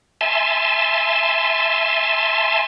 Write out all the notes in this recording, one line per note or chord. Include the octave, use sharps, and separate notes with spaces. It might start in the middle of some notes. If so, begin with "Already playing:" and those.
E5 G#5 A5 C6